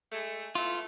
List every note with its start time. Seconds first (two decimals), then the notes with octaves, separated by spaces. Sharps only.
0.12 G#3 A3
0.55 A3 B3 E4 F4